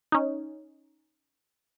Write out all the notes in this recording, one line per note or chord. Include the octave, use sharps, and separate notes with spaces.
C#4 D#4